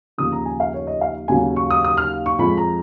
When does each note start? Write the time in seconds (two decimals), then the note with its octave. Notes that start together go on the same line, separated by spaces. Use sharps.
0.18 D#2 C#3 F3 D#6
0.32 A#5
0.45 G#5
0.60 F5
0.74 C#5
0.87 D#5
1.01 F5
1.28 D#2 C#3 F#3 G#5
1.56 C#6
1.70 D#6
1.84 D#6
1.97 F6
2.26 C#6
2.39 F2 F3 G#3 B5
2.57 A#5